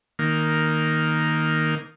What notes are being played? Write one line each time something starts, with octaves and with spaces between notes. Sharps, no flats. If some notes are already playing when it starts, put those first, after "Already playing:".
D#3 A#3